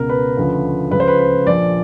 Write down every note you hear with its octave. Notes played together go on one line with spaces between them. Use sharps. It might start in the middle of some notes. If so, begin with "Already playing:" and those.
Already playing: C#2 B2 A#4
B4
D2 C#3 F3
C#2 C#3 F3 B4
C5
B4
B4
A#1 A#2 F3 D5